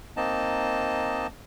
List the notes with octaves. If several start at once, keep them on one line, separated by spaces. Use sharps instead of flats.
A#3 C4 D#4 D#5 A5